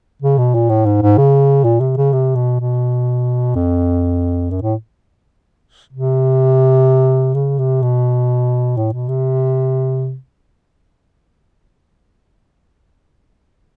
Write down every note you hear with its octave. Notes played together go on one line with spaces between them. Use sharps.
C#3
B2
A#2
A2
G#2
G#2
C#3
A#2
C3
C#3
C3
B2
B2
F2
F#2
A2
C3
C#3
C3
B2
A2
B2
C3